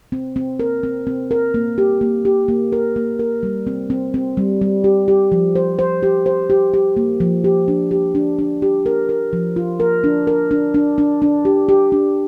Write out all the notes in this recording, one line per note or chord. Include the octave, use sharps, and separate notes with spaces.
C4
C4
A#4
C4
C4
A#4
A#3
G4
A#3
G4
A#3
A#4
A#3
A#4
G3
C4
C4
C4
G3
G3
G4
G4
F3
C5
C5
G4
C5
G4
G4
A#3
F3
G4
D4
G4
D4
D4
G4
A#4
A#4
F3
F4
A#4
D4
A#4
D4
D4
D4
D4
G4
G4
D4